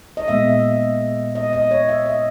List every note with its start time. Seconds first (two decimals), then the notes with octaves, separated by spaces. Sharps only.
0.17 D#5
0.28 A#2 G#3 B3 E5
1.35 D#5
1.53 D#5
1.71 C#5
1.89 E5
2.06 D#5